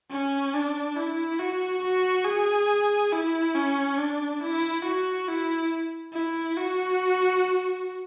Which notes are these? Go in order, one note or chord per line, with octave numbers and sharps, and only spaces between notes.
C#4
D4
E4
F#4
F#4
G#4
E4
C#4
D4
E4
F#4
E4
E4
F#4